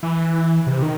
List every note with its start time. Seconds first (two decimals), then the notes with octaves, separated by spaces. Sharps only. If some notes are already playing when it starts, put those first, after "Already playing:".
0.03 E3
0.67 C3
0.82 D#3